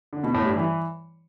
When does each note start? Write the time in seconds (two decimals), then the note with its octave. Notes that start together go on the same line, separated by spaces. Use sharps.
0.13 D3
0.23 B2
0.34 A2
0.45 G2
0.56 E3